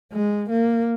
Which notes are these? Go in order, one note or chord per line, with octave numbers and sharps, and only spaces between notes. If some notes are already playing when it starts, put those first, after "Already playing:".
G#3
A#3